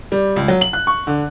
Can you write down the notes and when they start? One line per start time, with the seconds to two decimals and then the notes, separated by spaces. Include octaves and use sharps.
0.12 G3
0.36 C#2
0.48 F#3
0.61 F#7
0.73 F#6
0.87 C#6
1.07 D3